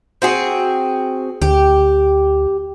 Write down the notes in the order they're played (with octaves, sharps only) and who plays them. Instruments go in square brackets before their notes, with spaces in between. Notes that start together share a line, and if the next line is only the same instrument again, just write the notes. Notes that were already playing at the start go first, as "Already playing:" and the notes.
[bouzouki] C4 F#4 G#4
[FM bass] D2 [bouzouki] G4